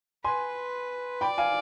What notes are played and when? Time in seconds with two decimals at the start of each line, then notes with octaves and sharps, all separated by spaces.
0.24 B4 G#5 C6
1.21 D5 G5 B5
1.38 F5 G#5